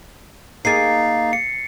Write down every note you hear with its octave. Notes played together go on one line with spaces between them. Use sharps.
A#3 D#4 G#4 A6 C7
C#7